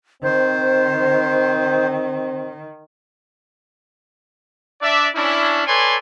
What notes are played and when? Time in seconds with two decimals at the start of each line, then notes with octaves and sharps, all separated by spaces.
0.23 D#3 C4 C5
4.82 D4 D5 E5
5.15 C#4 D4 E4
5.66 A4 B4 C#5 D5 G#5 C6